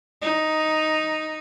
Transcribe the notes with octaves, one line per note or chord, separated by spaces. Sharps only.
D#4